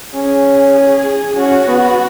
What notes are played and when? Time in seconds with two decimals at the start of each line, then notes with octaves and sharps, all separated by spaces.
0.14 C#4 G#4
0.76 G#4
1.37 C#4 F#4
1.68 B3